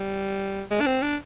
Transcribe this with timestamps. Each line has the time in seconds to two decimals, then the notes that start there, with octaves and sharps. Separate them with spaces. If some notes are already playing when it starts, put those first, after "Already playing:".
Already playing: G3
0.71 G#3
0.81 D4
0.87 C4
1.03 D4